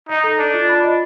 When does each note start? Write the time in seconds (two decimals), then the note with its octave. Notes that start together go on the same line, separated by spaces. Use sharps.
0.09 D#4 D#5
0.24 A4
0.39 D4 D5
0.54 F4
0.69 B5
0.84 D#5